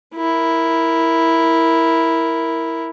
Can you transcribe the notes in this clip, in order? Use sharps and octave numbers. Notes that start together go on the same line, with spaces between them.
E4 A#4